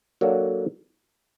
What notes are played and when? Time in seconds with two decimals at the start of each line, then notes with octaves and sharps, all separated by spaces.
0.21 F#3 A#3 D4 F#4 A4